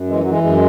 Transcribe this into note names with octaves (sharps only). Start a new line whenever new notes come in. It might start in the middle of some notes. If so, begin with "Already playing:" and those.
Already playing: F#2
E3 G#3
F#3
E3 G#3
F#2 G#3